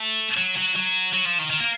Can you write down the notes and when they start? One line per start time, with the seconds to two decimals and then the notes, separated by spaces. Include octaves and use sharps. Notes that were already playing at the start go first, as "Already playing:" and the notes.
Already playing: A3
0.37 F#3
0.57 F#3
0.75 F#3
1.13 F#3
1.25 F3
1.39 D#3
1.50 D#3
1.60 A#3